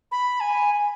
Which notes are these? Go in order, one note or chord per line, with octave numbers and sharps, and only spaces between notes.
B5
G#5